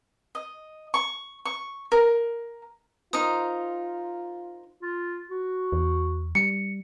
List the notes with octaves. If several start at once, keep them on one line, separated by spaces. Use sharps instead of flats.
D#5
C#6
C#6
A#4
D#4 F4 A#4 C5 D#6
F4
F#4
E2
G3 C#7